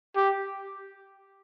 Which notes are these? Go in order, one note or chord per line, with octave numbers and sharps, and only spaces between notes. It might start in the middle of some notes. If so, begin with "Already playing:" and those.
G4